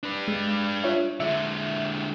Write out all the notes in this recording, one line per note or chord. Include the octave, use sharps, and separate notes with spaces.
D4 B4
G#3
F4 C#5 E5
D3 G#3 E5